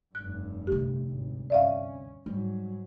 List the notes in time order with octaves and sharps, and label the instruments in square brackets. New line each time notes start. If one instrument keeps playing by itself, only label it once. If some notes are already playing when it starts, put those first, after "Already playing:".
[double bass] F1 G2 [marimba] F#6
[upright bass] D2 C3 [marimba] G4
[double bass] G#1
[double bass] G1 C#4 [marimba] D5 E5 F5
[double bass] G#2 F#3 [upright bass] G3